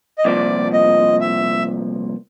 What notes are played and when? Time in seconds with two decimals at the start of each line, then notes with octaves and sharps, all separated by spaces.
0.18 D#5
0.25 C2 A#2 F3 D5
0.73 D#5
1.21 E5